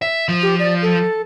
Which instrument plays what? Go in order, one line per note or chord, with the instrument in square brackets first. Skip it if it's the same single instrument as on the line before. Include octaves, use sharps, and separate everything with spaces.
[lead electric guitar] E5
F3
[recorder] G4
D5
A4